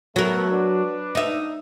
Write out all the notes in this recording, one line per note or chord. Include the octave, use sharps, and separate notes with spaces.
F#3 A3 B3 A#4
D4 B4
D#4 E5